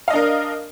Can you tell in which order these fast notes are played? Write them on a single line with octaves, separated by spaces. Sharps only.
F5 D#5 D4 A#4